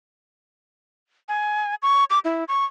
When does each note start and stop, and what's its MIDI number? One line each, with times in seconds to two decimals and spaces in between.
1.29 1.75 80
1.82 2.04 85
2.10 2.19 86
2.25 2.44 64
2.48 2.65 85